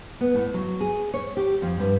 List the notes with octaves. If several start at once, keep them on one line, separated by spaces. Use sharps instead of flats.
B3
A2
F#3
G#4
C#5
G4
F2
G2